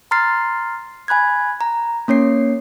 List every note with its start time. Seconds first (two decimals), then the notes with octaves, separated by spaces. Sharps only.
0.11 A#5 C6 F6 A6 C7
1.08 G#5 B5 F#6 G#6
1.61 A#5
2.08 A#3 C#4 C#5 C7